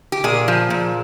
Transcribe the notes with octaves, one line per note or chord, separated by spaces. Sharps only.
G4
A#2 G#4
F3
A#2